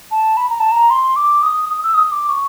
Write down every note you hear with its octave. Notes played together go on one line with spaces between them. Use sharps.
A5
B5
A#5
A5
A#5
C6
D6
D#6
D#6
E6
D#6
D6
C#6